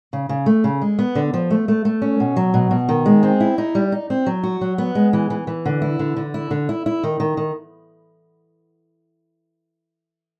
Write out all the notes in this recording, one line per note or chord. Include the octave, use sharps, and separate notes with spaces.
C#3
C#3
A3
C#3
G#3
B3
D3
F3
A3
A3
A3
C#4
B2
F#3
B2
B2
D#3
G#3
C4
E4
D#4
G3
D#4
C4
F#3
F#4
F#3
B3
G#3
E3
E3
E3
D3
E4
D3
D3
E4
D3
E4
E4
D#3
D#3
D#3